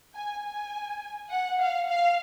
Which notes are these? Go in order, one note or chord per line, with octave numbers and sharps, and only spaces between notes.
G#5
G#5
F#5
F5
F5